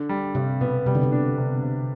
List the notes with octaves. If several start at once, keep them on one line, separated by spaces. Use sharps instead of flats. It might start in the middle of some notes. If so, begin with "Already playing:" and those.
Already playing: D3
G3
G2 C3
B2 B3
C3 G3
D3
C3
D4
C3
C3